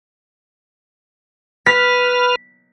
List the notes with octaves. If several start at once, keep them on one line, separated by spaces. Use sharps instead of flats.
B4 F6 B6